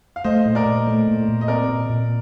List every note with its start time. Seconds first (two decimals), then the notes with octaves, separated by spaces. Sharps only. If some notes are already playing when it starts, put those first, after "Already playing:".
0.16 F5
0.24 A3 C5 D#5
0.46 A#2
0.55 A#4 D5
0.66 A#2
0.87 A3
1.07 A#2
1.28 A#2
1.41 D#5
1.48 C4 A#4 D5
1.69 A#2
1.90 A#2